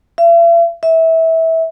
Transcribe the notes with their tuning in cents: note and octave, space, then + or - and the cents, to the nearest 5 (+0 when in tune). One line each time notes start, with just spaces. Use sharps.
E5 +45
E5 -20